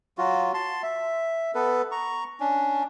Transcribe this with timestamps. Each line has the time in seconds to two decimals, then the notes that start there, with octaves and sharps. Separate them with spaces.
0.18 F#3 F4 F#4
0.54 A5 C6
0.83 E5
1.55 B3 A4 B4
1.92 A#5 C#6
2.40 C#4 D4